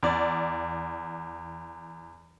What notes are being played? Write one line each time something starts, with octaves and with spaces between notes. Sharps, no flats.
E2 D5